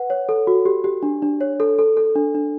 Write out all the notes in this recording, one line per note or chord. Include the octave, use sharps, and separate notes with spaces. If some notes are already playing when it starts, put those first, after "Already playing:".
Already playing: B4 F#5
C#5
A4
F#4
G4
G4
D4
D4
C#5
A4
A4
A4
D4
D4